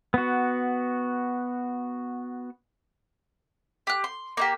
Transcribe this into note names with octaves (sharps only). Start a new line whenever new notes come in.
B3 F#4
G4 F#6
C6
A#3 D#4 G4